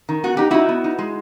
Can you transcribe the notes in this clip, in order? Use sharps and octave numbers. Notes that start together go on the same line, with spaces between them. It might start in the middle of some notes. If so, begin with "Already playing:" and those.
D#3
B3 F#4
D#4 G4
D#4 E4 F#4
B3
D#4
G#3